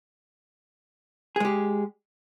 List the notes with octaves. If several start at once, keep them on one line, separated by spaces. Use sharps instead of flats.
G#3 G4 G#4